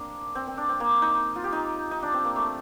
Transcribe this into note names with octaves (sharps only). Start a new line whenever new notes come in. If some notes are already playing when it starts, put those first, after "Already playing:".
Already playing: A#3 C4 D4
C4
C4
D4
C4
A#3
D#4
F4
G4
D#4
D#4
D4
C4
A#3
A3